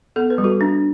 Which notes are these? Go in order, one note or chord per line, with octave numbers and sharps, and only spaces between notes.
B3 A4
B4
G3
F#4 A4
D4